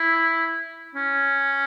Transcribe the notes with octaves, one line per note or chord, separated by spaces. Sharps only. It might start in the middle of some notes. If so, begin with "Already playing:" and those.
Already playing: E4
C#4